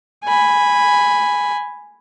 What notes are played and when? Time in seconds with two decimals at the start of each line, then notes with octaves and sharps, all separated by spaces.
0.25 G#5 B5